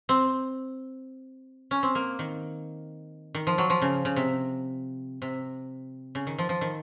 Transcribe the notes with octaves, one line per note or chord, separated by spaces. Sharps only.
C4
C#4
C4
A#3
D#3
D#3
F3
F#3
F3
C#3
C#3
C3
C3
C#3
D#3
F3
F3
D#3